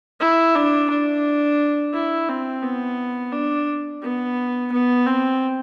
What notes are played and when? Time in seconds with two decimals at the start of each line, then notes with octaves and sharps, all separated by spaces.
0.20 E4
0.55 D4
0.90 D4
1.94 E4
2.29 C4
2.63 B3
3.32 D4
4.02 B3
4.72 B3
5.06 C4